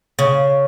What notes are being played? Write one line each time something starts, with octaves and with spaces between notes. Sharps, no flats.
C#3